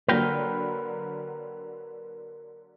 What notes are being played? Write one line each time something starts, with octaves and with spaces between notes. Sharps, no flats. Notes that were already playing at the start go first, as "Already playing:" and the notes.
D3 F#3 A#3 A#4 B4 G5